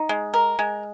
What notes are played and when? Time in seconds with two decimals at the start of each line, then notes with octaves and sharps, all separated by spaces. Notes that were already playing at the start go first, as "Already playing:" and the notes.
Already playing: D#4
0.09 G#3
0.34 A#4
0.59 G#3